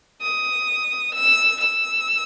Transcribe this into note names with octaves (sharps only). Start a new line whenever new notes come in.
D#6
E6
E6